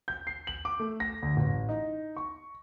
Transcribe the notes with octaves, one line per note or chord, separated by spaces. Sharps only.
G6
C7
F#7
D6
A3
A#6
D2
A1
D#4
C#6